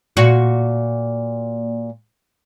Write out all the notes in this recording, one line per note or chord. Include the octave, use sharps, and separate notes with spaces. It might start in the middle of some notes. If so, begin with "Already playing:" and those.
A#2 F#4